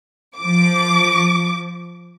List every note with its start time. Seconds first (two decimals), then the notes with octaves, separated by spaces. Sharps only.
0.37 F3 D6